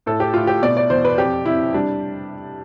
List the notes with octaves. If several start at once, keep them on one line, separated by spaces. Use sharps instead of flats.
A2 A4
G4
A2 F4
G4
B2 D5
D5
E2 C5
B4
F2 G4
C3 E4
G3 D4